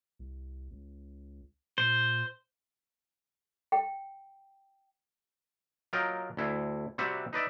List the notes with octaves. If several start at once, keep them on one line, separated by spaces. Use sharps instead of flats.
C2
C#2
A#2 C5
G5
F#3 F4 A#4 D#5 G5
D2 E4
C3 G3 C4 F#4 E5 F#5
D#4 B4 D5 E5